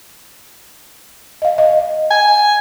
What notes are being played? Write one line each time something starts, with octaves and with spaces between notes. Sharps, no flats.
D#5 F5
D#5
G#5